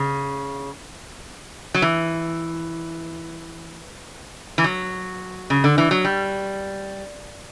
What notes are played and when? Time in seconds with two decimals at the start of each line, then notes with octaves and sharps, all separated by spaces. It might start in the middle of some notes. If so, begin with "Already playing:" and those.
Already playing: C#3
1.74 F#3
1.82 E3
4.58 E3
4.64 F#3
5.50 C#3
5.64 D3
5.78 E3
5.91 F#3
6.05 G3